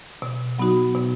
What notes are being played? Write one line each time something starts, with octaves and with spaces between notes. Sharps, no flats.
B2
F#3 B3 D#4 F#4
B2